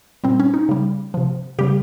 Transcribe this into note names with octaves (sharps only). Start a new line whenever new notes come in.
A#2 G3 C4
C#4
D#4
C#3 G3
C3 F3
C#3 G3 G4